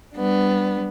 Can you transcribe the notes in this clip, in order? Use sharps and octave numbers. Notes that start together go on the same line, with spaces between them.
G3 B3 D4